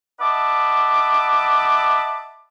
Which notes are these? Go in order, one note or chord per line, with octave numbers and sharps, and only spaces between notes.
D#5 E5 F#5 A5 B5 D6